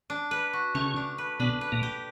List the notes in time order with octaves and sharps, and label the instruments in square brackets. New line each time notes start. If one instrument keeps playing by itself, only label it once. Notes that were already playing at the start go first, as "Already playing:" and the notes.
[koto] D4
B4
F#4
[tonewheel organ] C#3 C#4 [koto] A3
[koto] D4
B4
[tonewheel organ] B2 B3 [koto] D4
[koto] B4
[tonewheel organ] A#2 A#3
[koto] G4